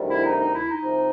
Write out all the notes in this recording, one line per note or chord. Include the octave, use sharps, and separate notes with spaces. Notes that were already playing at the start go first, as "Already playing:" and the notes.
Already playing: D2 C3 D#3 G3
E4
D#4
D#4
E4
D#4
C2 C3 F3